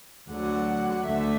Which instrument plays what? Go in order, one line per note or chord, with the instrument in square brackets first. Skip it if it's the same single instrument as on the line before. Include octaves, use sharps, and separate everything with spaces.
[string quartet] D2 D3 F#3 F#5
D2 D3 A3 E5